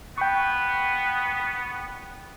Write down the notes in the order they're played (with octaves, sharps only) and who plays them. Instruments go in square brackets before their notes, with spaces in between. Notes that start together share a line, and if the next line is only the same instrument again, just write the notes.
[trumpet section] B3 [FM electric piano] G5 C#6